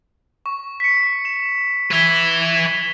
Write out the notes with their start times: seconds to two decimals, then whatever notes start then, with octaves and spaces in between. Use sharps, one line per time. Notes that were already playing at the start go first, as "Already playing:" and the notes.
0.46 C#6
0.80 B6 C#7
1.25 E7
1.91 B4 E5 G#6 B6 G7